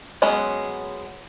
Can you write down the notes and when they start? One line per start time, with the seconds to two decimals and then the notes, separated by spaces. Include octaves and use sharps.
0.22 F#3 G#3 B3 C#4